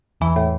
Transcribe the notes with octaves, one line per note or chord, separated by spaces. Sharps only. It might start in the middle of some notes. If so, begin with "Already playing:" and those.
E2 E3
A2